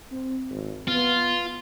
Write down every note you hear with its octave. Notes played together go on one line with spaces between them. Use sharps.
C4
G#1
B3 F4